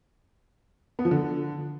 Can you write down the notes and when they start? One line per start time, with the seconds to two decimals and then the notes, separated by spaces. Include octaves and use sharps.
0.99 B3
1.05 F3
1.11 D3